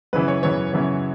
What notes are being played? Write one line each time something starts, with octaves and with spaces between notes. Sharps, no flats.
F#2 C#3 E3 B3 B4
C#5
F#2 C#3 E3 B3 C#5
F#2 C#3 E3 B3